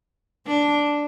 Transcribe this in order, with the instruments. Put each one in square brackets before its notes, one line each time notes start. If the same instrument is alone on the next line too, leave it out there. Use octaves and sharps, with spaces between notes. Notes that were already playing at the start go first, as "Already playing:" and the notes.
[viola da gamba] D4